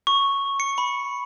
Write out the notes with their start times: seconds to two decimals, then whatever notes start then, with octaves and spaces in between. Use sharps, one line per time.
0.07 C#6
0.60 C#7
0.78 B5